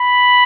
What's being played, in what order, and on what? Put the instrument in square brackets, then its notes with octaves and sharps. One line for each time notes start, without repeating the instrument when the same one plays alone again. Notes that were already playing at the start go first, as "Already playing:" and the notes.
Already playing: [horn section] B5